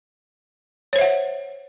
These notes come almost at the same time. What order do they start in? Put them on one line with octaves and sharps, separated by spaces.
C#5 C5 E5 F#5